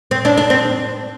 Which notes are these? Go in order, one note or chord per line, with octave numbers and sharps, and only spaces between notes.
C4
D4
D4
C4